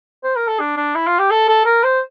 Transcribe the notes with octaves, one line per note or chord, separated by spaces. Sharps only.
C5
A#4
A4
D4
D4
E4
F4
G4
A4
A4
A#4
C5